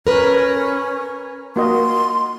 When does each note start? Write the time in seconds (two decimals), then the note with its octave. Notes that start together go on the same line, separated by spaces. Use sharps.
0.07 C#4 A#4 B4
1.56 A#3 F#4 D#5 C6